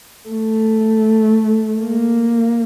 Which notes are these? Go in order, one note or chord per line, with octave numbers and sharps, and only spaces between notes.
A3
A#3